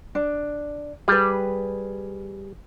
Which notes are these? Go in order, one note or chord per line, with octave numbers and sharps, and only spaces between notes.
D4
G3 G#4 B4